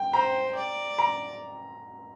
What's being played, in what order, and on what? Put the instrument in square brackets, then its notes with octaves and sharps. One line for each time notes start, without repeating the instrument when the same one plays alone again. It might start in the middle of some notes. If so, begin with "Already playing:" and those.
Already playing: [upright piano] G5
[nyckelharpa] C5 [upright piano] A#5
[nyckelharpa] D5
[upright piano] A#5